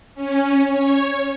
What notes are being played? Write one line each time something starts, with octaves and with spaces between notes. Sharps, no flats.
C#4
C#5